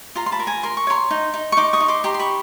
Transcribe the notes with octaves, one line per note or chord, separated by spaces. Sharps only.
F4 A#5 C6
C6
A5 B5
A#4
G#5 A#5
A#4 C6
C#6
C#5 A#5 C6
D#4
D#4
C#6
D#4 C6 D6
C#6 D#6
D#4
C6 D6
G4 A#5 C6
C6
B5 C#6